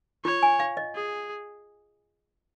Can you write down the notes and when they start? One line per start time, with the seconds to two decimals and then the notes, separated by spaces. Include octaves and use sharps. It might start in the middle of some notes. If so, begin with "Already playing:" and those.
0.25 F4 C#5
0.43 G#5
0.60 F5
0.77 D#5
0.95 G#4